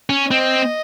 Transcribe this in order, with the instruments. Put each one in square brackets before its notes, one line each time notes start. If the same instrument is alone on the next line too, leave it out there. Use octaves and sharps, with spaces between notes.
[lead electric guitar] C#4
[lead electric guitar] C4 [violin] D#5